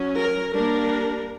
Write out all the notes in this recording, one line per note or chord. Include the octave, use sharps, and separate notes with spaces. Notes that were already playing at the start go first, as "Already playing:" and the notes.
Already playing: F#3 C#4
A#4
G3 A#3 D4 A#4